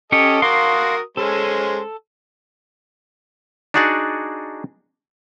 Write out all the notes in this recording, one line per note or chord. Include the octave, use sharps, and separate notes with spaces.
C#4 G4 A4 C#5 D#5
F#4 A#4 F5 C6 D6 D#6
G#3 C#4 A4 C5
D4 D#4 F#4 G#4 D5 F#5